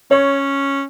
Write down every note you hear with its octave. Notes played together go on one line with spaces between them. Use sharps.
C#4 C#5